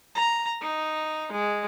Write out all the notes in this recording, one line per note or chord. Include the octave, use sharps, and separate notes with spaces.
A#5
D#4
G#3